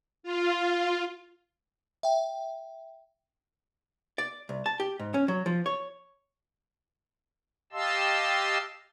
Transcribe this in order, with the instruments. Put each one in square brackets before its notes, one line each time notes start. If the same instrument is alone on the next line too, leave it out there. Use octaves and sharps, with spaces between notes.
[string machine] F4
[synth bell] E5 G5
[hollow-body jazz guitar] D5
C2
A5
G4
G#2
C#4
F#3
F3
C#5
[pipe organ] G4 D#5 F5 A5 C6 E6